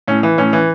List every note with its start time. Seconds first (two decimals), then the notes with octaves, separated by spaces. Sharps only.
0.08 A2 C#4
0.23 E3
0.38 A2 C#4
0.53 E3